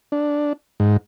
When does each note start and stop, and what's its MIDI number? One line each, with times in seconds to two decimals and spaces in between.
0.12 0.53 62
0.80 0.97 44